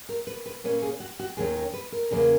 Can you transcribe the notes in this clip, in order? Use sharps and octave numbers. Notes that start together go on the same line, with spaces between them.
A#4
B4
B4
A#2 A#3 C#4 B4
G#4
F#4
F#4
D#2 D#3 F#3 C#4 G#4
A#4
B4
A#4
E2 C#3 F#3 A#3 C#4